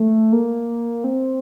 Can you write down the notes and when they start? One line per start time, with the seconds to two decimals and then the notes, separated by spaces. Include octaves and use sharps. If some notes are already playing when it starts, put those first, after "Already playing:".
Already playing: A3
0.32 A#3
1.04 C4